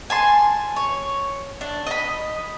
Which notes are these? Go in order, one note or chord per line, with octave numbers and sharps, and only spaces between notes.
G#5 A5 C6
C#5
D4
D#5 B5